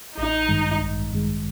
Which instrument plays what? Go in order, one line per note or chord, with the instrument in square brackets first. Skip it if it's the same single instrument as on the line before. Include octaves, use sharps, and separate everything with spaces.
[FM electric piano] A1 [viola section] D#4
[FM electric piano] G2 D#3 G#3
A1
G2 D#3 G#3